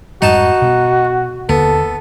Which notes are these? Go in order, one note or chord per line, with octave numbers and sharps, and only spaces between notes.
F2 G#2 G3 D#4 F#4 A5
B2
D#2 D3 A#3 B3 A4